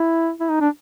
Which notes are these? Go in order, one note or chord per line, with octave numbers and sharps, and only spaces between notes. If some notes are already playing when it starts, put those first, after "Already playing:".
Already playing: E4
E4
D#4
D4